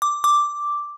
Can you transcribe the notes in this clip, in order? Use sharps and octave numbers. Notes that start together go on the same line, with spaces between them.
D6
D6